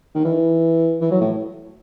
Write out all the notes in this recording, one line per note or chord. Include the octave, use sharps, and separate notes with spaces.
D#3
E3
E3
F#3
A2